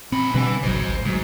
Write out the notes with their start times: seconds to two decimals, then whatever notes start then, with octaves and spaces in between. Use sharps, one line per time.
0.12 A#2 C4 B5
0.34 B2 D3 G3 B4 G#5
0.63 G#1 C#2 F#3 C5 D#5
0.89 G#1 D2
1.05 D2 G#2 F#3